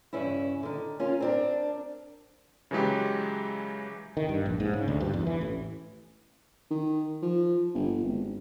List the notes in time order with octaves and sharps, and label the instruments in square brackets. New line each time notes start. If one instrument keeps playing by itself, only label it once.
[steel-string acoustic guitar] G2 C#3 E3 C#4 E4
D3 D#3
C#4 F4 A#4
C4 D4 A#4
[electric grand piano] C#3 E3 F#3 G#3 G4
[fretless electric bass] D#3
G2
A#1
G#2
C#3
D2
G2
E2
E3
A1
[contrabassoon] D#3
F3
G1
G#1